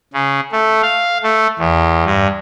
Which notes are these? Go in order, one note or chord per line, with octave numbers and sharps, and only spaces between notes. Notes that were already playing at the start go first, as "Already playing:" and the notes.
C#3
A3
F5
A3
E2
G2